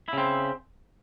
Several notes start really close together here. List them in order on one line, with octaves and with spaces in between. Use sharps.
E4 C#3 C4